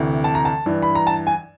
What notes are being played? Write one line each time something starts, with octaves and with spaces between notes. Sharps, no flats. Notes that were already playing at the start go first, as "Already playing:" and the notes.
Already playing: D2 C3 E3
A5
A#5
A5
G2 E3
B5
A#5
A5
G#5